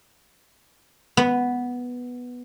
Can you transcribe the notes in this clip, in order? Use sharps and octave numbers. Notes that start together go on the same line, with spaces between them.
B3